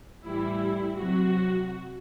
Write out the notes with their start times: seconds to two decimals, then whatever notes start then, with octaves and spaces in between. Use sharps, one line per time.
0.24 A2 E3 G3 E4
0.97 C3 F#3 F#4